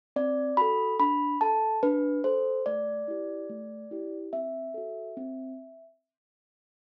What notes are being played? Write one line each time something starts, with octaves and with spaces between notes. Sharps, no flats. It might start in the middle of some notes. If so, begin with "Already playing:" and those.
C4 D5
F#4 A4 B5
D4 B5
A4 A5
D4 B4
A4 C5
A3 D5
E4 G4
A3
E4 G4
C4 E5
F#4 A4
C4